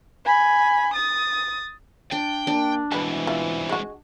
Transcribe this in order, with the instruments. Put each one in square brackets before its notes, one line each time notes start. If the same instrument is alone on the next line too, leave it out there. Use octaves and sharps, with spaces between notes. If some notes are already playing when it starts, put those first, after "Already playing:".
[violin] G#5 B5
D#6 A6
[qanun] D4 [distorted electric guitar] G5
[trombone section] A#3 [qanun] D4
[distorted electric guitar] C2 G#2 [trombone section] B2 E3 [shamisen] B4 A5
[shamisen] E4 F4
G#3 F#4